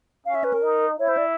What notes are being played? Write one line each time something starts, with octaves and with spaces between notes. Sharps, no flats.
C#4 F5
E5
B4
A#4
D#4
E4 C#5
C5
D5